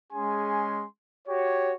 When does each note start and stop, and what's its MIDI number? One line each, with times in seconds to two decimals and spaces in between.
0.13 0.85 56
0.13 0.85 61
0.13 0.85 68
0.13 0.85 80
0.13 0.85 84
1.27 1.74 66
1.27 1.74 67
1.27 1.74 73